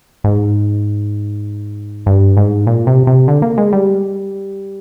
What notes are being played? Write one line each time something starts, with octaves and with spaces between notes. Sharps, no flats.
G#2
G2
G#2
A#2
C3
C3
D3
A#3
G#3
G3